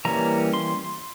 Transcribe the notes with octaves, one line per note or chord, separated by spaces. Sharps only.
E3 G3 A#3 C#4 A#5
C6